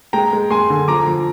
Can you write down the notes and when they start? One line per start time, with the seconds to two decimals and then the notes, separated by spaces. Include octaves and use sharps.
0.13 G#3 G5 A#5
0.33 G#3
0.50 G#3 G#5 C6
0.70 D3
0.88 F3 A#5 D6
1.07 F3